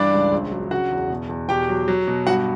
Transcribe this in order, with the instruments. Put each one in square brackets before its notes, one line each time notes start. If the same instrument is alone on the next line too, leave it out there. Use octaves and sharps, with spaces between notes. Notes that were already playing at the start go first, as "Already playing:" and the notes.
Already playing: [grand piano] G2 E3 D4 D5
C#2
A#1
F#3
C#3 F#4 F#5
E2
B2
E2
B2 G4 G5
F#3
F#3
B2
G2 F#4 F#5